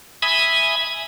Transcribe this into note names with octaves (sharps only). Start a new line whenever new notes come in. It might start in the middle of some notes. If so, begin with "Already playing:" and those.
E5 G#5 B5 D#6